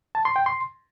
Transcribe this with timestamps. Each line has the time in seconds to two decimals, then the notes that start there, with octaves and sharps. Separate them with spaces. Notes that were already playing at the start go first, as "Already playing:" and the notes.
0.15 A5
0.25 C6
0.36 G5
0.46 C6